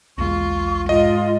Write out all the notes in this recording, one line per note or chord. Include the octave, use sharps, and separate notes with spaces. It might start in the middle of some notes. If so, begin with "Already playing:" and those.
B1 E2 G#3 F4 C#6
G#2 F4 D#5